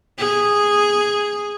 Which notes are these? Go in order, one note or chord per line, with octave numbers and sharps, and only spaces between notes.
G#4